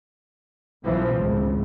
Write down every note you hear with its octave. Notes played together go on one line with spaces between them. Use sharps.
B1 F#2 E3 F3
G#1 C#2 A2